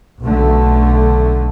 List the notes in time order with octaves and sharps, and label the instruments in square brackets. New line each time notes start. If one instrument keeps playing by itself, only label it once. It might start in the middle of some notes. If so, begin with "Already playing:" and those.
[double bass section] B1 D3 A3